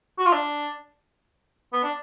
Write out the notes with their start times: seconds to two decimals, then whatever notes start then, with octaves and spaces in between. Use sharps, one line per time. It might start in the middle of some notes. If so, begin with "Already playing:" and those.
0.19 F#4
0.26 F4
0.33 D4
1.73 B3
1.83 D4